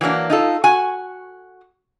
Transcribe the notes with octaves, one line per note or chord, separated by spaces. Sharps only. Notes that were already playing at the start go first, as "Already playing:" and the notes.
E3 F#3 A#3 D4
D#4 F4 A4
F#4 G#5